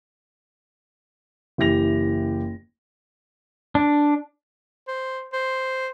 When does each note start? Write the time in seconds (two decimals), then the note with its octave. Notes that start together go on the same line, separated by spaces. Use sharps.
1.58 F#1 E3 G4 A#6 F7
3.75 D4
4.87 C5
5.33 C5